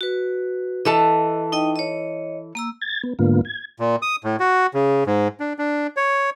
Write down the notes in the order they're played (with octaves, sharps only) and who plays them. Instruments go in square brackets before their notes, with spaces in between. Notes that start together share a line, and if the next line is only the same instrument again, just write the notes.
[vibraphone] F#4 B4
[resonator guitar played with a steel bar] E3 A4 A5 [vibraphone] D#5
[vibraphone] D#4 D#5 G5
C#5 D#5
A#3 A#5 E6
[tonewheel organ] G#6 A6
B3
G#2 D3 A#3 B3 F4
G#6
[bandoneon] A#2
D#6
A2
F#4
C#3
G#2
D4
D4
C#5